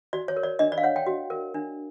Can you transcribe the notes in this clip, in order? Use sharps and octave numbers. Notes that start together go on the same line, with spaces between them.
F#4 D5
C#5
A#4
D5
D4 D#5
D5
F5
C#5 F#5
G5
F#4
A#4
D4